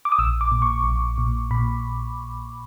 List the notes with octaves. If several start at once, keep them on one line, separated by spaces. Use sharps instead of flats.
D6
D#6
A#1 E6
D6
A#2
C#6
A#1
A#2
A#2 B5